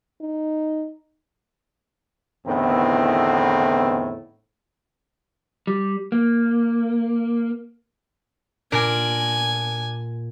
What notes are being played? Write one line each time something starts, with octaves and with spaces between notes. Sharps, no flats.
D#4
E2 A2 D3 D#3 B3 C4
G3
A#3
A#2 D4 A#4 G#5